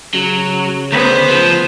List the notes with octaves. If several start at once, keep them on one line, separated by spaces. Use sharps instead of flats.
C#3 F#3
D2 B3 C5
F3